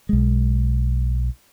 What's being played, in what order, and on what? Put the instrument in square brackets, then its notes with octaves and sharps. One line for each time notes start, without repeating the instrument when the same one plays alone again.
[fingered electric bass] B1 G#3